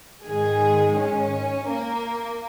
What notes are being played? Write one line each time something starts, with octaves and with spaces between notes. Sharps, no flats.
G#2 D#3 G#3 G#4
C#4
A#3